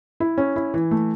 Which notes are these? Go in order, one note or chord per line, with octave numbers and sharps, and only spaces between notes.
E4
C#4
E4
E3
A3